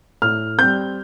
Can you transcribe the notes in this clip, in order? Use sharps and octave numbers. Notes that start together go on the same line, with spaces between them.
A2 F6
G3 C4 G6